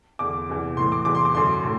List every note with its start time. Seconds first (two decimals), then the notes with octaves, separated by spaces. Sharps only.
0.19 E2 D3 D6
0.49 E2 C3 E3
0.77 A2 E3 C6
0.92 D6
1.05 E2 C3 E3 D6
1.15 C6
1.25 D6
1.34 F#2 D3 C6
1.63 A2